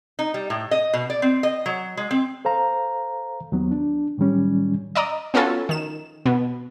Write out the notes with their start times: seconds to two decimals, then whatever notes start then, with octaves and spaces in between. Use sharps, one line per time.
0.19 D#4
0.34 G3
0.50 A2
0.71 D#5
0.93 B2
1.10 D5
1.22 C4
1.43 D#5
1.66 F#3
1.97 G#3
2.11 C4
2.45 A4 C5 F5 A#5
3.52 D#2 F#3 B3
3.71 D4
4.18 A2 D#3 F#3 G3 C#4
4.95 D5 D#5 A#5 D#6
5.34 B3 C#4 F4 F#4 A4
5.69 D#3 E7
6.25 B2 B3